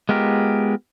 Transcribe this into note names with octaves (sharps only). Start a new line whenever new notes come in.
G#3 B3 F4 G4 A#4